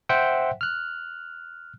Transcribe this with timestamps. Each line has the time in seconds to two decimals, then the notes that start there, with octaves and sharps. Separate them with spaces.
0.09 C5 E5 F#5 G5
0.61 F6 F#6